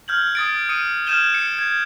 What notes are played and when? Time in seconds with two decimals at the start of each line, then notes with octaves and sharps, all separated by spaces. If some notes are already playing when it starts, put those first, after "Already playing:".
0.08 F6 G6 G#6 F#7
0.35 D#6 A6 D7
0.69 D#6 C#7 D#7
1.07 F6 G6 G#6 D#7 E7 G7
1.34 C#7
1.59 G#6